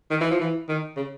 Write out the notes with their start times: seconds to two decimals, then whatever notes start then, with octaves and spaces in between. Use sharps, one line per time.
0.11 D#3
0.21 E3
0.31 F3
0.40 E3
0.69 D#3
0.97 C#3